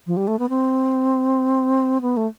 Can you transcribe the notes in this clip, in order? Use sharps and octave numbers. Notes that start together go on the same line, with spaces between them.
F3
G3
A3
B3
C4
B3
A3